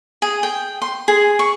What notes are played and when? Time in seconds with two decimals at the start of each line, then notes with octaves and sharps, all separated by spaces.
0.22 G#4
0.43 G5
0.82 C6
1.08 G#4
1.39 C#6